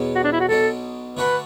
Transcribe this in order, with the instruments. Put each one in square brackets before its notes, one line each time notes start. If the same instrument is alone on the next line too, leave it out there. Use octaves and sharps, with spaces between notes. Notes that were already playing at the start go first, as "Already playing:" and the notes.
Already playing: [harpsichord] E2 B2 F#3 B3
[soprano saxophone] F#4
D4
E4
F#4
[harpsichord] B1 B2 F#3 D4 [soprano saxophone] A4
[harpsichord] D3 A3 D4 F#4 A4 [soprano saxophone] B4